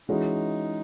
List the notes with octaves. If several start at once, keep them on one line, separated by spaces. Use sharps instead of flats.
E3 G#3 C#4 D#4 F#4